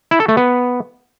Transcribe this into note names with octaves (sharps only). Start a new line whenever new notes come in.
E4
A4
A3
B3